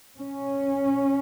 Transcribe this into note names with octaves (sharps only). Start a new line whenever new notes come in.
C#4